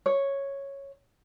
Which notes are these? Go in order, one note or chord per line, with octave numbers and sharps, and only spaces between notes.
C#5